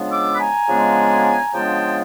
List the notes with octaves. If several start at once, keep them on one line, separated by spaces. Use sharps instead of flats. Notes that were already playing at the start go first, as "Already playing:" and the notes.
Already playing: C#3 F3 G#3 B3 D4
D6 E6
B5
G#5 A#5
C#3 F3 G#3 B3 D4
C#3 F3 G#3 B3 D4 G5 A5